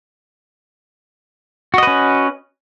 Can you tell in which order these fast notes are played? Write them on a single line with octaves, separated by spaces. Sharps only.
F#4 D#5 B4 C#4